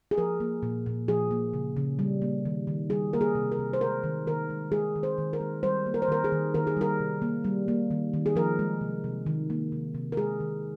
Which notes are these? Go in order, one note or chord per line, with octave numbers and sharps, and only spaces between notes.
G#4
F3 A#4
A#3
A#2
A#2
F3 G#4
A#3
C#3
C#3
G3
A#3
D#3
D#3
G3 G#4
A#3 A#4
G#4
C3
A#4
C3
C5
G#3 A#4
D#3
D#3 A#4
G#3
G#3 G#4
D#3
C5
D#3
A#4
G#3
G3 C5
A#3
A#4
C5
D#3 A#4
G#4
D#3
D#3 A#4
G#4
G3 A#4
C3
A#3
G3
A#3
D#3
D#3
G#4
F3 A#4
G#3
C3
C3
D#3
A#3
C3
C3
A#4
G#3 G#4
D#3